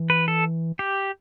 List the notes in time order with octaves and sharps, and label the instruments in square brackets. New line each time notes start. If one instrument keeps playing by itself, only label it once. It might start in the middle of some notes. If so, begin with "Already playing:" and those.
Already playing: [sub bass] E3
[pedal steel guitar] B4
A4
G4